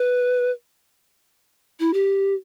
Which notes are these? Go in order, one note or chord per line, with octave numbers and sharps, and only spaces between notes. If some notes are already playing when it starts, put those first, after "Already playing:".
Already playing: B4
E4
G4